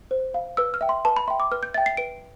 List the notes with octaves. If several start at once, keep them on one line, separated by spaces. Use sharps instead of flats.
C5
F5
B4 E6
F6
E5 G5
C6
B4 A5
B5
E5 G5 C6
D6
B4 F6
G6
E5 G5 A6
C7
B4 D7